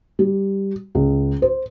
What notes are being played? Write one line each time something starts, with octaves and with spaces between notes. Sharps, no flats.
G3
C#2
C5